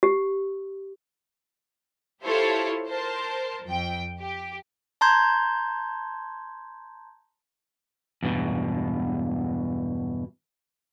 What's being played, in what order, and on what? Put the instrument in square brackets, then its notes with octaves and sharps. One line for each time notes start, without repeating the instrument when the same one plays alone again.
[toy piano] G4
[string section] E4 F4 G4 A4 C5 C#5
A#4 C5 A5
F2 G5
G4
[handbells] A5 A#5 C6 G6 G#6
[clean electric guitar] E2 G2 B2